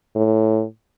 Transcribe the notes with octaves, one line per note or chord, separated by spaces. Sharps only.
A2